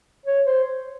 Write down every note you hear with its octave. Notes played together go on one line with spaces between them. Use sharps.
C#5
C5